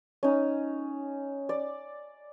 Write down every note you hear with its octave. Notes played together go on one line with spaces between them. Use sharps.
C#4 D#4
D5